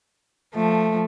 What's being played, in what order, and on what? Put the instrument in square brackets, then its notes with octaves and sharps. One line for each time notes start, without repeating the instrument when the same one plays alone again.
[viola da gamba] F3 A3